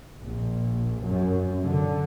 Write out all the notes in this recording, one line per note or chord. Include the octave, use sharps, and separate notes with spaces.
A#1
F#2
D3